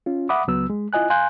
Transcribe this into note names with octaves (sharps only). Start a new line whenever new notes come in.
C#4 F4
E5 F#5 B5 D6 D#6
C#2 F#3 B3 E6
G#3
E4 F4 D#5 G#5 F#6
F5 G#5 C6 F#6 G6